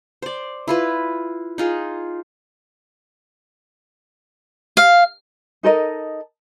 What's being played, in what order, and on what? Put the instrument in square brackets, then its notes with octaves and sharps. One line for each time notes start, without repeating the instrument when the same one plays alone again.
[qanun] C5 D5
E4 F4 B4
D#4 F4 G#4
[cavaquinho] F5
[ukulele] D#4 A4 A#4 D#5